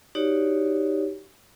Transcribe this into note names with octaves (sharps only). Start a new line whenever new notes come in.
D#4 F#4 G4 C#5 D5